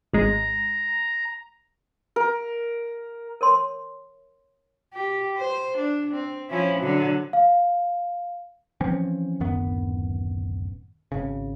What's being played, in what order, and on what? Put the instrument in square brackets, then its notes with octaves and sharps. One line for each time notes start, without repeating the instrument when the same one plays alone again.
[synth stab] G#1 G#3 [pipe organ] A#5
[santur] A#4
[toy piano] A#4 C#5 C6
[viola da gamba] G4
C5
D4
C4
F3 C#4 E4
D3 F#3
[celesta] F5
[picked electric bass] E3 F3 C4 C#4
D1 F#2 D#3 B3
G#1 C#3